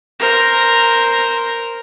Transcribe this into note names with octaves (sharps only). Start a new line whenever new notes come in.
A#4 C5